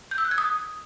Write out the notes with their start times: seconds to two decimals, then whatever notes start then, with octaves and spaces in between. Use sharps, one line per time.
0.11 G6
0.18 E6
0.25 F#6
0.31 G#6
0.38 D#6